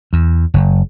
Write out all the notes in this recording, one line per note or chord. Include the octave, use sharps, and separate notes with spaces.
E2
F#1